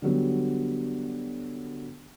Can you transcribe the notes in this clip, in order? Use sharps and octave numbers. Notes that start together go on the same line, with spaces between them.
D3 F#3 G3 B3